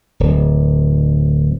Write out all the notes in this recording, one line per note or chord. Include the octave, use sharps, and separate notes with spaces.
D1